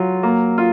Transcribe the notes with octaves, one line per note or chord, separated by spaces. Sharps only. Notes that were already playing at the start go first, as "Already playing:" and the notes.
Already playing: F#3 F4
A#3
F4